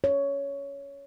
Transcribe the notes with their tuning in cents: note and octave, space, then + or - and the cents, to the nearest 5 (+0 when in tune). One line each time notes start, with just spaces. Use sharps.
C#5 +10